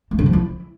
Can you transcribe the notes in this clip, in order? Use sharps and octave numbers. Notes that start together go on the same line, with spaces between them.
A3
D3
F3
E4